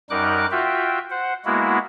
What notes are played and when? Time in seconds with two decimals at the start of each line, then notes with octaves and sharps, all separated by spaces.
0.10 F#2 G3 D#4 A#4 D6 F#6
0.51 F4 F#4 E5 G5
1.10 C5 F#5
1.45 G#3 A#3 B3 E4 F#4